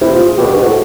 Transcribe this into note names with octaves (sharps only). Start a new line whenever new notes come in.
C3 E4
F4
G#4
B2 G4
G2 F#4
G#2
F#4
A2